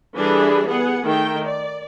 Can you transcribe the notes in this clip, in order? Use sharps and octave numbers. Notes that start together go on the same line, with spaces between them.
E3 G3 D4 G#4 A4 B5
B3 G#4 F#5
D#3 A3 G5
D5